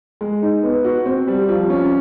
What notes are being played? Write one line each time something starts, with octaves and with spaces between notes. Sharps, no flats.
G#3
D#4
B3
F#4
C4
G3
F3
C#4